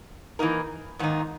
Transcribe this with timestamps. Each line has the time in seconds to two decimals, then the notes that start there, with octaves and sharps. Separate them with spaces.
0.39 E3 A#3 D#4 A#4
0.99 G#2 D#3 A#3 D#4